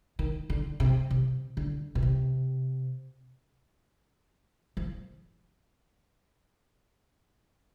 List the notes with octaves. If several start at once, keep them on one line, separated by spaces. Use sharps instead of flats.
D#3
D3
C3
C3
D3
B2
C3
F3